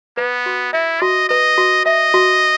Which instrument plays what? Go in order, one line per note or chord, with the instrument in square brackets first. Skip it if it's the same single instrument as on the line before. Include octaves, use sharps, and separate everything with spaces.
[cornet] B3 [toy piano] B4
[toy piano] F#4
[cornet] E4 [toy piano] E5
[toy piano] F#4 [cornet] D#5
[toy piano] B4 [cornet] D#5
[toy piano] F#4
[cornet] D#5 [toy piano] E5
[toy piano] F#4